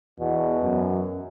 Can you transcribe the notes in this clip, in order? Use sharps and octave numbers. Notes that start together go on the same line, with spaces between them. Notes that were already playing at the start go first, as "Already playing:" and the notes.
E2 B2
F#2